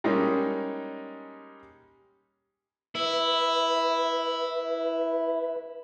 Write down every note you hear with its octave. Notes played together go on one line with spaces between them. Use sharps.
G3 G#3 A#3 C#4 D#4
E4 B4 E5